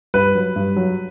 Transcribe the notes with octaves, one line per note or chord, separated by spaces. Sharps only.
G2 B4
F#3
G2
F#3